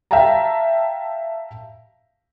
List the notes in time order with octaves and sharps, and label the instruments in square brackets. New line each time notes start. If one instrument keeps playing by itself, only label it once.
[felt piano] E5 F5 G5 A5 A#5